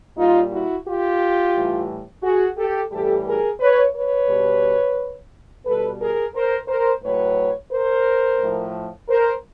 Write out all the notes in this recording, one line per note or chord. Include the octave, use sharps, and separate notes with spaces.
A#2 G3 D#4 F4
E4 F#4
F4 G4
A2 E3 G3
F#4 G#4
G4 A4
A2 E3 G3 G4 A4
G#4 A#4
B4 C#5
B4 C#5
B2 G3
B2 G3 A4 B4
G#4 A#4
A#4 C5
A#4 C5
A2 F#3 B4 C#5
A#4 C5
A2 F3
A#4 C5